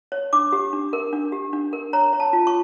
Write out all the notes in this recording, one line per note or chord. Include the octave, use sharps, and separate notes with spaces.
C#5
D4 D6
G4
D4
A#4
D4
G4
D4
A#4
C#5 A#5
C#5
A5
F4
C#6